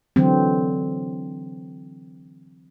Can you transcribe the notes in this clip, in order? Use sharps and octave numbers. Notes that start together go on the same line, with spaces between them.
D3 E3 F#3 C4